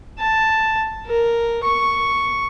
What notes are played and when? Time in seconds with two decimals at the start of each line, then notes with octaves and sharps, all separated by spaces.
0.19 A5
1.06 A#4
1.63 C#6